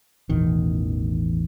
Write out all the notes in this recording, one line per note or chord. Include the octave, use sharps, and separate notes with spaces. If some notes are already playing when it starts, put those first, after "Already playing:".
A1 E2 B2 D#3